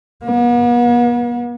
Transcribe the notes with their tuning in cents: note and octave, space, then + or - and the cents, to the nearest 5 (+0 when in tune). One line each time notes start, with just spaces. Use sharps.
B3 -45